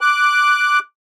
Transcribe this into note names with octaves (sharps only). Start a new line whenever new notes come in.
D6 F#6